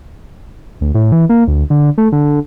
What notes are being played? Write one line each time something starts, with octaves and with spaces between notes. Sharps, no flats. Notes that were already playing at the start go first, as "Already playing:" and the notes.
D2
A2
E3
A#3
D2
D3
A3
D3